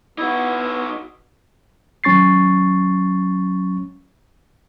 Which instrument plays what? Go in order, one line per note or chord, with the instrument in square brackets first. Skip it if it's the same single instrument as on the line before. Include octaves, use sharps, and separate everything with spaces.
[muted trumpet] B3 [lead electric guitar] D#4 F#4 [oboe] E4
[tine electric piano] G#1 F#3 C#4 C#6 A6 C7